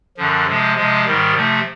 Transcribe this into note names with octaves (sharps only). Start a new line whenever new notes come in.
F#2 D3 F3
C3 F3 G#3
C3 F3 G#3
G#2 D#3 G3
C3 F3 A3